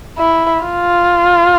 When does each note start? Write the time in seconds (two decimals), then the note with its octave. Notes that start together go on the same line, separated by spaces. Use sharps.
0.19 E4
0.64 F4